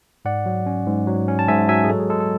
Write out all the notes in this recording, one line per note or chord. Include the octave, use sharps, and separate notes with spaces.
G#2 D5 F#5
F#3
C#4
G#2
F#3
C#4
A5
G#2 E5 G#5
F#3 E5 G#5
G#4
G#3 A4
G#4
G#3 A4
A4